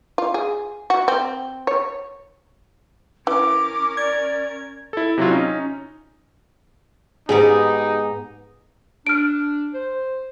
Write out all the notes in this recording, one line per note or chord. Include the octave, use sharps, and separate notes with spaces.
F4
G#4
F#4
C4
C#5
E3 C#4 A#4 D6
D5 G#6
E4 A4
C3 F#3 E4 F4
C#4 D#4
G#2 B3 D#4 G4 G#4
D4 F6 D7
C5